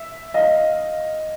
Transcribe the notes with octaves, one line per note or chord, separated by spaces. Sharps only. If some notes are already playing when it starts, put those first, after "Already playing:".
Already playing: E5
D#5 F5